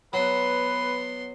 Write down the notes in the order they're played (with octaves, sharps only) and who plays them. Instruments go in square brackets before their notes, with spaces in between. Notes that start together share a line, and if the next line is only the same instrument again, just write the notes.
[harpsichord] F#3 [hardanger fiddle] B3 C6 [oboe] B4